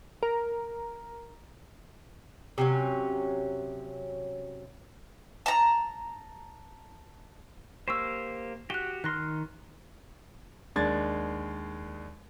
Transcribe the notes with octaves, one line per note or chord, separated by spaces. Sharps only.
A#4
C3 F#3 C#4
A5 A#5
A#3 G4 C5 C#6 E6
F#4 G4 F#6 G7
D#3 C6 F6 F#6 A#6
D#2 G#3 D4 G#6 A6